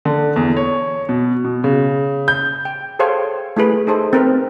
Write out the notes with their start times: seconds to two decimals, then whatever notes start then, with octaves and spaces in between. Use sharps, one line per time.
0.05 D3
0.36 E2
0.57 C#5
1.09 B2
1.45 B2
1.64 C#3
2.28 G6
2.65 G5
2.99 G#4 A4 C5 C#5 F5 G5
3.57 A3 E4 G#4 B4
3.87 D#4 G#4 A4 C5
4.13 C4 A#4 B4